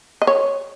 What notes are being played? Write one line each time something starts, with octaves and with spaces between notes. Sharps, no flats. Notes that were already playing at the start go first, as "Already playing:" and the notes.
D#5
C#5